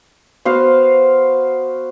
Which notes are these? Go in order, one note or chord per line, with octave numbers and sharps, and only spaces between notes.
B3 F#4 C5 F5